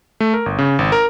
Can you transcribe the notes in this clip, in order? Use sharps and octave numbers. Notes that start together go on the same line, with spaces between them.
A3
A#4
G1
C#3
G#1
A#4